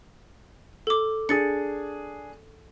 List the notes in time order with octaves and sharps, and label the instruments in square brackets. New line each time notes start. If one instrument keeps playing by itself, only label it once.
[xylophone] A4 D6
[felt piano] D4 G#4 [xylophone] A6 C#7